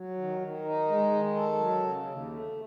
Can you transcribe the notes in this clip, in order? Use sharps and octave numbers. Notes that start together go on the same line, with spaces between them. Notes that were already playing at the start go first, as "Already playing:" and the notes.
Already playing: F#3
D#3
D#3
D#4
G#3
D#3
A4
F#3
C#3
D#2
A3